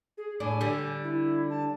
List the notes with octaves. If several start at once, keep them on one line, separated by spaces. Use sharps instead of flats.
G#4
A2 D4 G#5
D3 G3
E4
A5